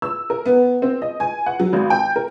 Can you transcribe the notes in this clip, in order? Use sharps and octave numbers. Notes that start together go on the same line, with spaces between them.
E6
A#4
B3
C4
D#5
G#5
F#5
F#3
G#1
G5
A#4